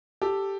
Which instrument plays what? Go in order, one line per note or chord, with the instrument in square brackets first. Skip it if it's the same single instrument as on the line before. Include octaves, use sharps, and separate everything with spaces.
[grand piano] G4 A4